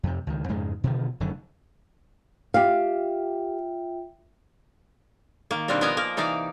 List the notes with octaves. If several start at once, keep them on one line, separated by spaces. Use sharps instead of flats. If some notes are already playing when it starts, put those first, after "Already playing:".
F2 C3
C#2 D#3
F2 G#2 C#3 G#3
B2 D3 D#3 F3
F1 F#2 D3 D#3
F4 G4 E5 F5 G5
D#3 A#3
B2 D#3 G3 C4 D4 A#4
F3 B3 A#4 D#5 G#5 A#5
A#3 A#4
C3 E3 D#4 A#4 D5 F5